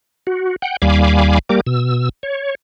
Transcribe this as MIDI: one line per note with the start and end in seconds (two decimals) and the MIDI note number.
0.27 0.56 66
0.62 0.77 78
0.62 0.77 79
0.82 1.39 39
0.82 1.39 55
0.82 1.39 77
0.82 1.39 80
0.82 1.39 83
0.82 1.39 86
1.49 1.61 55
1.49 1.61 58
1.49 1.61 67
1.49 1.61 70
1.49 1.61 86
1.67 2.09 47
1.67 2.09 88
2.23 2.55 73